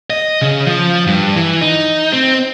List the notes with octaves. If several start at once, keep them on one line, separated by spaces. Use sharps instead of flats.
D#5
C#3
F3
G2
E3
D#4
C4